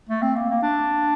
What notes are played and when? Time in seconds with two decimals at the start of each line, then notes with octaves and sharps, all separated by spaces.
0.09 A3
0.23 C4
0.36 A#3
0.50 A#3
0.62 D4